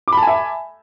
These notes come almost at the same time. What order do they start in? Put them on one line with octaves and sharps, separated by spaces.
D6 B5 A5 G#5 E5